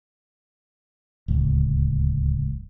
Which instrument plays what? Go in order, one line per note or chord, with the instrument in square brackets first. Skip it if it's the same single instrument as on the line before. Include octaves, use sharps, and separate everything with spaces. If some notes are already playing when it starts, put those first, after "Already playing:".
[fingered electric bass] D1 C#2